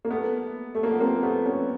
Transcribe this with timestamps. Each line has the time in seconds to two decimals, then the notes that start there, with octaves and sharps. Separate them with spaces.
0.05 A#3
0.11 A3 B3
0.75 A3
0.83 A#3
0.92 B3
1.00 A#3 C4
1.23 A3 B3
1.46 B3 C#4